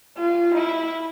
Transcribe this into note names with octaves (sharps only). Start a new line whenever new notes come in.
F4
E4